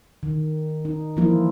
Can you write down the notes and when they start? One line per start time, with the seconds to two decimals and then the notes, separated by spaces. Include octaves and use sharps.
0.23 D#3
0.85 D#4
1.17 E3 F3 G3 A#3 E4 F4